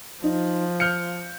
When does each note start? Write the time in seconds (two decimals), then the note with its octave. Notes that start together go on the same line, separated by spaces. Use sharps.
0.24 F3 D#4
0.80 F6 G6 C#7